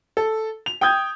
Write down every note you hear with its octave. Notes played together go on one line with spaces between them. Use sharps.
A4
F7
G5 D#6 G6 G#6